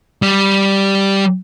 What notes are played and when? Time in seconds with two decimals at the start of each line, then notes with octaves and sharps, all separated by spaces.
0.22 G3